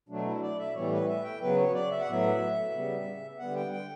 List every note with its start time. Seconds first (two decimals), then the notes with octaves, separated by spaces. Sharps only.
0.09 B2 F#3 A3 D4
0.26 E4
0.42 D5
0.59 E5
0.75 A2 E3 G3 B3 C#5
0.92 B4
1.08 E5
1.24 G5
1.41 C#3 F#3 B3 B4
1.57 C#5
1.74 D5
1.91 E5
2.01 F#5
2.08 A2 F#3 B3 E5
2.73 C#3 G3 B3
3.39 D3 G3 B3 F#5
3.55 G5
3.72 G5